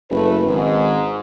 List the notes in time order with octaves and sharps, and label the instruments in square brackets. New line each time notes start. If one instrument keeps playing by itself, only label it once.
[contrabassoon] F#1 [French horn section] A3 B4
[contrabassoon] G#1 [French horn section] G#2